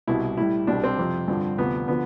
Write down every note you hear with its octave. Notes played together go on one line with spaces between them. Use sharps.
C2 B2 G3 E4
A2 G3 E4
C2 B2 G3 D4
C4
F2 C3 F3
G2 D3 F3
D2 C3 F3 B3
D3 F3 B3